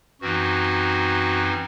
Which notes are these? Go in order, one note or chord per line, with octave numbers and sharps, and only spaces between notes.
F#2 E3 C4 D#4 F#4